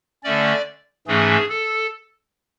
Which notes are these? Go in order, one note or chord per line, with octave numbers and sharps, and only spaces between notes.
D3 A3 C#4 D5
G#2 E3 A3 C#4 G#4
A4